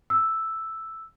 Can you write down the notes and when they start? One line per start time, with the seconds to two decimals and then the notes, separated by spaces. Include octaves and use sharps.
0.10 E6